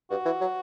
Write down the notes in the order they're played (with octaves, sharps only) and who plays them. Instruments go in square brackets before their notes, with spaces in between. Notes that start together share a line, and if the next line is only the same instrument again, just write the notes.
[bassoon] G2 [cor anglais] F#4
[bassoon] E3
F#3